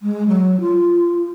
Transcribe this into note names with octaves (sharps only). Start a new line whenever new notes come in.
G#3
F#3
F4